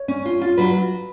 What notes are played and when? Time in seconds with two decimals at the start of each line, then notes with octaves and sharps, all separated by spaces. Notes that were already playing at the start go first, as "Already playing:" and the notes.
Already playing: C#5
0.08 C#4
0.26 F4
0.41 F4
0.57 F#3 B4